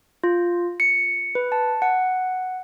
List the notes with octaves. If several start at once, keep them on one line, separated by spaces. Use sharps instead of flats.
F4
C#7
B4
A5
F#5